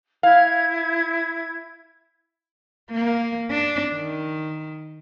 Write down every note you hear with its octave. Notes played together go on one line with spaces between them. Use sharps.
E4 F5 G#6
A#3
D4
D#3